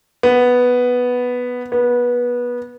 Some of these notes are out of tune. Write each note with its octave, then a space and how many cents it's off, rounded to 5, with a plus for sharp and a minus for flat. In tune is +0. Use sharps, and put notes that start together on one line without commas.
B3 +0
B3 -20